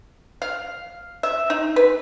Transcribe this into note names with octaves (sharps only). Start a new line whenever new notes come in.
F5
E5
D#4
B4